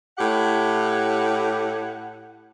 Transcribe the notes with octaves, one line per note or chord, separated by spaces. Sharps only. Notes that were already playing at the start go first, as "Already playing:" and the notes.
A2 G4 F#5